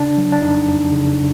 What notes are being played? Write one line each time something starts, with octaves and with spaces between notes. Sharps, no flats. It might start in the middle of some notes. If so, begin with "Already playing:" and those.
Already playing: C#3 D4
F#3
D4
F2 D#4
F2
C#3